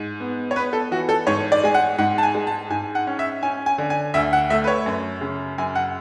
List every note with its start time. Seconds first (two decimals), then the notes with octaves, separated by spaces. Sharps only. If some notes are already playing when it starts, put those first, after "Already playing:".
Already playing: G#2
0.20 B3
0.51 C#5
0.56 B3 B4
0.73 A4
0.91 E3 F#4
1.09 A4
1.27 G#2 C#5
1.52 D5
1.64 G#3 G#5
1.74 F#5
1.98 G#2 F#5
2.18 A5
2.23 G#5
2.35 G#3
2.47 A5
2.70 G#2 G#5
2.95 F#5
3.07 C#4
3.19 E5
3.43 C#4 G#5
3.66 G#5
3.78 D3
3.90 G#5
4.14 D2 E5
4.33 F#5
4.50 A3 E5
4.64 B4
4.67 C#5
4.86 F#2
5.21 C#3
5.58 F#2 G#5
5.75 F#5